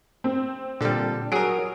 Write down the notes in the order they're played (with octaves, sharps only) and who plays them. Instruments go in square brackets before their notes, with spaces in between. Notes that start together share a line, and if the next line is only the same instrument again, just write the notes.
[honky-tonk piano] C4
[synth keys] A#2 A4 [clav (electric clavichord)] D3 G3
[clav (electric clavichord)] F#3 G#4 [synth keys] F#4 A#4 [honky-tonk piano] D#6 D7